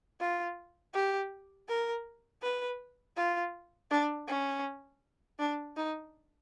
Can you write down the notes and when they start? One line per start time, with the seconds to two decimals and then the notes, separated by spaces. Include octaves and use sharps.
0.20 F4
0.94 G4
1.69 A#4
2.42 B4
3.17 F4
3.91 D4
4.28 C#4
5.39 D4
5.77 D#4